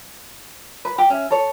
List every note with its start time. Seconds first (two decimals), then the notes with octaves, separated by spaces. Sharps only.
0.85 B4
0.98 G4
1.10 C#4 E5
1.30 A4 C#5